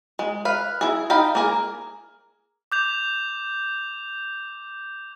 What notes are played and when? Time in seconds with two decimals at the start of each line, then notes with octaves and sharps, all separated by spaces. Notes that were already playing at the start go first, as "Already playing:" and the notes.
0.19 G#3
0.45 B4 F5
0.81 E4 G#4
1.10 D#4 F5 G5 B5
1.35 A#3 G#4 A#4
2.72 D6 G6 F7